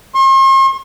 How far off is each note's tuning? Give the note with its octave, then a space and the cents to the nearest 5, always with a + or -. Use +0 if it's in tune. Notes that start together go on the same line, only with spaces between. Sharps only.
C6 +45